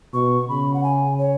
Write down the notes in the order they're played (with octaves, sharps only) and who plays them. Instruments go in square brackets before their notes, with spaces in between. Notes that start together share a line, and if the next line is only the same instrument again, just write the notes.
[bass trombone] B2 [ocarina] C#6
[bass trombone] C#3 [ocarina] B5
[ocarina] F#5
G#5
C#5